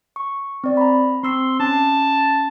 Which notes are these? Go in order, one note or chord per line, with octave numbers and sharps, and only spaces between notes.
C#6
C4 D5
A#5 B5
C4 C6 E6 C7
C#4 A5